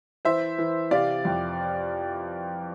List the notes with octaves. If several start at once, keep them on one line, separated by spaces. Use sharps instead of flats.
E3 C5 E5
E3
C3 D5 F5
F2